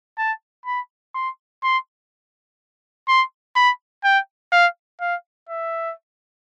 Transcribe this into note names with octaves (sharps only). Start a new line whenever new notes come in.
A5
B5
C6
C6
C6
B5
G5
F5
F5
E5